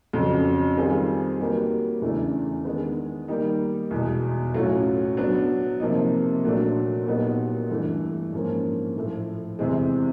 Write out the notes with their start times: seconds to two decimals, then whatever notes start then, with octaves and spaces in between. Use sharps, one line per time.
0.13 F2 C#3 F#3
0.76 D#3 G3 C4 F4 G#4
1.39 F#3 A#3 D#4 G4 B4
2.02 E2 C#3 E3 A3 D4
2.65 D#3 G#3 B3 D4
3.28 D#3 G3 A#3 D#4 G4
3.91 E2 B2 G#3
4.54 A2 F#3 A3 C#4 F4
5.17 F#3 B3 D4
5.80 C3 F3 A#3 D#4
6.43 A#2 F#3 A3 D4
7.06 A#2 F#3 B3 D#4 G4
7.70 G2 E3 A3
8.33 G#2 F3 A#3 C#4
8.96 A2 F3 A3
9.59 E2 C3 E3 G#3 C4